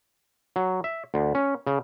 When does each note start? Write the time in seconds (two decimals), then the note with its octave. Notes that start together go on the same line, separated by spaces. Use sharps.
0.56 F#3
0.84 E5
1.14 D2
1.35 C#4
1.67 C#3